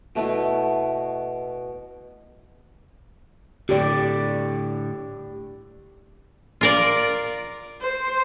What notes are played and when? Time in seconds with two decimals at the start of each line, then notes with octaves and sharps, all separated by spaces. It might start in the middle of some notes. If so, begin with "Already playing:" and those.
0.15 B2 A3 B3 E4
3.69 A2 D3 G4 D5
6.61 F4 A#4 D5
7.81 C5